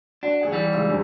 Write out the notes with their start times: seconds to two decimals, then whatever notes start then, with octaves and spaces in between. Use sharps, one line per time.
0.23 D4 F#4
0.41 D#2 G#4 F#5
0.53 E3 G3
0.73 G#2 C#3 E6
0.88 G#1 E2 G2